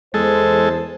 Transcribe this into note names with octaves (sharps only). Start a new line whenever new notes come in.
E2 G#3 A4 C5